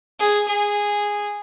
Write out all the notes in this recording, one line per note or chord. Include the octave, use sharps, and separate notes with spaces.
G#4
G#4